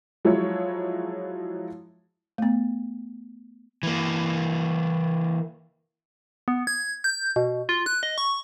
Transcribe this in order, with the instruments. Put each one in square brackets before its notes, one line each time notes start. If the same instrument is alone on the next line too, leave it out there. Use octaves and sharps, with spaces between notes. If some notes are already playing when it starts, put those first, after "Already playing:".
[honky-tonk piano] F3 F#3 G#3 E4 C#5
[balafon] A3 B3
[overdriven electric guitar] E3 A#3
[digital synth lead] B3
G#6
G6
B2
F4
F#6
D#5
C#6